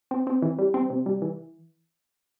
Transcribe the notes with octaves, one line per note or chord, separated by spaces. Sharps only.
C4
C4
E3
G3
C4
C3
G3
E3